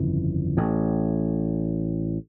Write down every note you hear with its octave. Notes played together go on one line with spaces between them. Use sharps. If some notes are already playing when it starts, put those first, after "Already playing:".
Already playing: G1 F2 C#3 E3
A1 A2